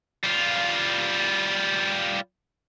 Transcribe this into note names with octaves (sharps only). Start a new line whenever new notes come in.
G3 F4